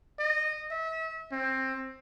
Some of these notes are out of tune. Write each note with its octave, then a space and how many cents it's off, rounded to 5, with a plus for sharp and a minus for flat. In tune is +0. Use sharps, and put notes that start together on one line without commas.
D#5 -15
E5 -35
C4 +15